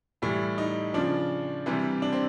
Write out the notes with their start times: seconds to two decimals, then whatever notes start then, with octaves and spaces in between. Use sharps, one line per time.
0.22 A2 E3 G3
0.58 D#4
0.94 C#3 F3 D4
1.66 C3 E3 G3
2.02 D4
2.13 C4